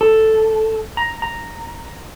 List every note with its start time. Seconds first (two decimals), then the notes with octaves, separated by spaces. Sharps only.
0.01 A4
0.97 A#5
1.22 A#5